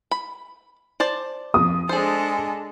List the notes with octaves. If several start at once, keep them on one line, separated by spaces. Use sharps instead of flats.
B5
C5 D5 A5
F2 D#6
G#3 D4 G#4 A4 C5